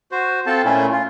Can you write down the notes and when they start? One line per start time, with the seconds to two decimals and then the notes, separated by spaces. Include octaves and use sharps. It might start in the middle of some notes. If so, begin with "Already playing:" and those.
0.12 F#4 C5
0.46 C4 F4 A4 A5
0.65 A#2 A3 C#4 E4
0.92 F4